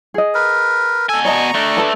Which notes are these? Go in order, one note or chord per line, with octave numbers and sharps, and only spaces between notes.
G#4 D#5
A#4 B4
B2 A4 G#5 A5
D5 D#5 A5 A#5 C#6
A3 D4
A4 B4 A5